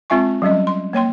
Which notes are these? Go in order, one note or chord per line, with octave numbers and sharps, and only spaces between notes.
G#3 C4 F4 E5 G#5 C#6
F#3 G3 C#4 D#5
C6
A#3 C#5 G5 C6